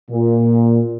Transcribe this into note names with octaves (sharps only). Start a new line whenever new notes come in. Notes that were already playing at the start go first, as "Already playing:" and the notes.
A#2